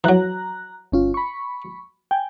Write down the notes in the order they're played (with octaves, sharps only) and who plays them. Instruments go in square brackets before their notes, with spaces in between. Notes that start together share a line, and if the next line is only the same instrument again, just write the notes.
[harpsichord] E3 F#3 [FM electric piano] A#5 F#6
[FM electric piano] G1 C#4 F4
B5 C#6
G5 G#5